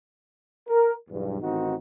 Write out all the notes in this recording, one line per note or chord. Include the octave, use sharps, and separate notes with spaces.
A#4
B1 E2 G2
A1 D#3 C4 D#4 F#4